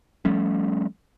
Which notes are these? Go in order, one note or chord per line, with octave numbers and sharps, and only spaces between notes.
F3 G3 A3 C#4